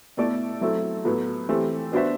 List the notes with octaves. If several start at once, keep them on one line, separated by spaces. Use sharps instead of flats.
B2 A3 E4 A4 D5
F#3 A3 C4 E4 A4
A2 F#3 B3
E3 A3 C4 G4
B3 D4 F#4 C5 E5